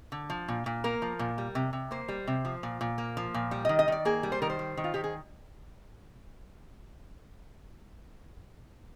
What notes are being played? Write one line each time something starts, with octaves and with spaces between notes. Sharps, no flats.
D3
F3
A#2
A#2
A#3 A#4
F3
A#2
G3
C3
C3
A#3 C5
G3
C3
F3
A#2
A#2
A#3
F3
A#2
G3
D#3 D#5
D#5
D#3 D5
A#3 G#4
G3
C5
D#3 A#4
C5
G3
D#3
F4
D#3 G4
G#4